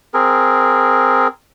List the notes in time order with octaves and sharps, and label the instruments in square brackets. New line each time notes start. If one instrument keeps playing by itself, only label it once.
[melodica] C4 G#4 A#4